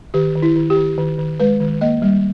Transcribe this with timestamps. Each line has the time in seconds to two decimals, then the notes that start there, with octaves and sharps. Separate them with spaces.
0.14 D#3 G4
0.35 D#3
0.42 E4
0.56 D#3
0.70 G4
0.77 D#3
0.98 D#3
1.18 D#3
1.40 G#3 B4
1.60 D#3
1.81 A#3 D#5
2.02 G3